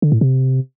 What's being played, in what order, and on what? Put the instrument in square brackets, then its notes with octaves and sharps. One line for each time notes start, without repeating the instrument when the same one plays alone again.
[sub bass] D3
A2
C3